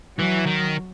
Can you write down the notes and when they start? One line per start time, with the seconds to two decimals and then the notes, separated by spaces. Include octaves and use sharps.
0.18 E3 F#3
0.46 D#3